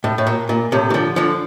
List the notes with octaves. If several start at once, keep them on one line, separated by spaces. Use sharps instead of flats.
A2
A2
A#2
A#2
A2 C3
E3
D3 F3
D3 F3